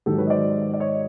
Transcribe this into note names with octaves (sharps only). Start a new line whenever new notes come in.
G#2 D#3 F#3 G4 A4
B4 C#5
D#5
C5 D5
D5
C#5 D#5